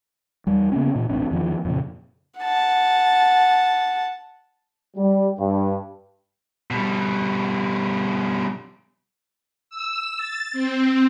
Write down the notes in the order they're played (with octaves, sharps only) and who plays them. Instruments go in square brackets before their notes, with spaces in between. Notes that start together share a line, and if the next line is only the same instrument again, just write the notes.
[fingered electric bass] E2 G3
C#3 A#3 B3 C#4
A#2 E3
E1 A1 C4 D4
E2 D#3 F3
F2 A#2 C#3
[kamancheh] F#5 A5
[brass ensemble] G3
G2
[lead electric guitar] B2 G3
[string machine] E6
A6
C4